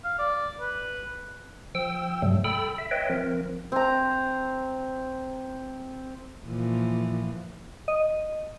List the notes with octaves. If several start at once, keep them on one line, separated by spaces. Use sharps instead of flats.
F5
D5
B4
F3 G5 E6
G2 C3 F#3 G3 A3
A4 G5 B5 E6
E5
B4 C#5 D#5 E5 G5
F3 C4 A#4
C4 A#5
A#2 E3 F3
D#5